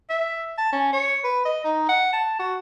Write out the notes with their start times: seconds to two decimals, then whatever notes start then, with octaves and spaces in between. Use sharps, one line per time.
0.10 E5
0.58 A5
0.72 C#4
0.93 C#5
1.24 B4
1.45 D#5
1.64 D#4
1.89 F#5
2.13 A5
2.39 F#4